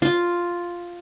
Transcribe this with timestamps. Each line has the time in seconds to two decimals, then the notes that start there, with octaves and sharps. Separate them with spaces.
0.02 F4